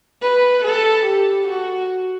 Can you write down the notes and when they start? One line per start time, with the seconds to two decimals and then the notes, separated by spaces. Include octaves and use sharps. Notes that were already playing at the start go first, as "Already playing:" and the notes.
0.22 B4
0.64 A4
1.05 G4
1.48 F#4